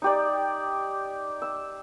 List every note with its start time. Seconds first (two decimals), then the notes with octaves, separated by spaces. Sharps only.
0.02 D#4 G4 D5
1.42 E6